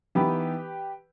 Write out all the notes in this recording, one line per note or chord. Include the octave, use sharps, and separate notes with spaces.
E3 B3 D#4 G4 B4